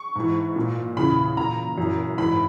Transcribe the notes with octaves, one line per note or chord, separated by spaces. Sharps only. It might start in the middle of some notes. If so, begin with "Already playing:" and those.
Already playing: C#6
G#2 E3
A#2
E2 C#3 E3 B5
A#2 A#5
F#2 E3
G#2 E3 B5